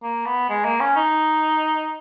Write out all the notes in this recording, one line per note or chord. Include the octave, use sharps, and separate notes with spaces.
A#3
B3
G#3
A#3
C#4
D#4